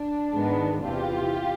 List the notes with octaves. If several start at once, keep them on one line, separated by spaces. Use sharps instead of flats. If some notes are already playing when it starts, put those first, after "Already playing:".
Already playing: D4
G#2 D#3 G#3 B3
E2 C3 E3 F4 G4